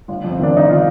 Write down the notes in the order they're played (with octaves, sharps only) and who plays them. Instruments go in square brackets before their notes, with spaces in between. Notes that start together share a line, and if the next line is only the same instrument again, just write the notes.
[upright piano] G1
F2
C4
D#3 D4
G1 D#4
D#3 F4